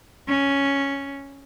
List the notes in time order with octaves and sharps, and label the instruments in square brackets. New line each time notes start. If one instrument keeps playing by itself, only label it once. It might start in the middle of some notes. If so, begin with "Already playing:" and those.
[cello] C#4